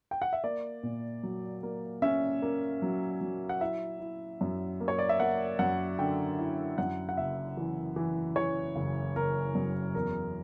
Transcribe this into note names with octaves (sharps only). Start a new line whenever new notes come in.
G5
F#5
E5
A#3 D5
A#2
F#3
A#3
C#4 E5
A#3
F#3
F#3
F#5
E4 E5
E4
F#2
A#3
C#5
D5
E5
A#3 F#5
F#2 F#5
D3 G5
E4
F#2 F#5
F#5
F#1 E5
E3
E3
E3 C#5
F#1
F#1 A#4
F#2
E2 A#4